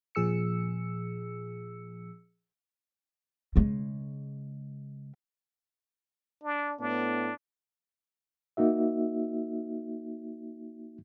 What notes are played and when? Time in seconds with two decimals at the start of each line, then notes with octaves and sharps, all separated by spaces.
0.15 A#2 F3 G#4 E6 C#7
3.56 C#3 G#3
6.43 D4
6.80 A2 B3 D4
8.57 A#3 D#4 F#4 E5